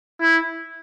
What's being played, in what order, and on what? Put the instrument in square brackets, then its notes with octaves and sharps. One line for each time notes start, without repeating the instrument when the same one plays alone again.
[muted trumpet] E4